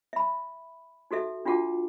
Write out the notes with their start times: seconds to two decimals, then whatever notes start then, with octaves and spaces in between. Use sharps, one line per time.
0.13 E5 B5
1.11 D#4 F#4 A4 E5
1.45 D4 F4 F#4 F#5 A5 D6